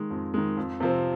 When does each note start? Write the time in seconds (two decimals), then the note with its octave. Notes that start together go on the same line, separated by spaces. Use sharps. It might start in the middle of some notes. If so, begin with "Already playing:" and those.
Already playing: D#3 G#3
0.11 F2
0.34 D#3 G#3
0.57 F2
0.80 C3 F3 C4